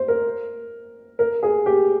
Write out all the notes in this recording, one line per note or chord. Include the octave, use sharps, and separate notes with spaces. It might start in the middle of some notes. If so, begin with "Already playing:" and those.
Already playing: C5
A#4
A#4
G#4
G4